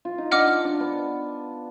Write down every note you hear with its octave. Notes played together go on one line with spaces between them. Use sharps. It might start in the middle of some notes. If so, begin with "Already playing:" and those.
F4
D#4
D4 D#5 F#5 D6 F6
D#4
D4
B3